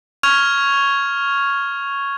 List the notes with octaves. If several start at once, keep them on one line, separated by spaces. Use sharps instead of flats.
C#6 F6 G#6 F7